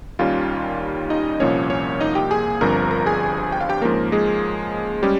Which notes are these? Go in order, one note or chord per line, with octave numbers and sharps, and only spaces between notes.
D#2 D#3 G3 C#4 F4 F5
D#4 D#5
C2 A#2 F3 A#3 C#4 C#5
C#4 C#5
D#4 D#5
G4 G5
G#4 G#5
G1 G2 F3 C4 A#4 A#5
A#4 A#5
G#4 G#5
G5
F5
G4 G5
G#2 F3 A#3 C#4 A#4
G#3 G#4
G3 G#3 C#4 G4